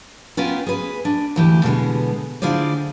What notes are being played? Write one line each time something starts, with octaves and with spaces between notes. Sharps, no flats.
B3 C#4 F4 A#4 G5 G#5
G#4 B4
D4
D2 E3 G4
B2 D3 G#3 B3
D3 E4 F4 G#4 C5 D5